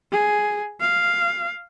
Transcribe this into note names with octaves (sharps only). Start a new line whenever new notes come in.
G#4
F5